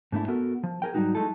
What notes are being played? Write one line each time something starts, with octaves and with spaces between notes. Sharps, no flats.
G#2 A3 D4 E4
B3 F#4 A4 A#4
F3
G#4 A#4 G5
G#2 F#3 G3 A3 D#4 F#4
F3 G#3 A3 D#4 E4 A4